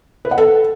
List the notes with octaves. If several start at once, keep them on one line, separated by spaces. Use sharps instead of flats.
B4
F#5
A4